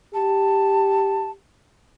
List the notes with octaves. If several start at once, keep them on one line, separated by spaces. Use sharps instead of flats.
G4 A5